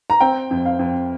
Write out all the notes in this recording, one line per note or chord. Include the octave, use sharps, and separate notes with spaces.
A#5
C4 G5
F2
F5
F2